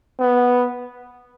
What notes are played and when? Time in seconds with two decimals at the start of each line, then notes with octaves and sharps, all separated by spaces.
0.19 B3